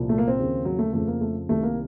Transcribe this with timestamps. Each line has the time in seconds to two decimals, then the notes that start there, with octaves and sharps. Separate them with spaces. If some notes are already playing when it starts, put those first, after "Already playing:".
Already playing: C2 A#2 F3
0.09 A3
0.18 A#3
0.28 C4
0.37 D#2 C#3 F3
0.65 F#3
0.79 A3
0.93 F2 C#3 F3 A3
1.07 A#3
1.21 A3
1.49 C2 C3 D#3 A3
1.63 A#3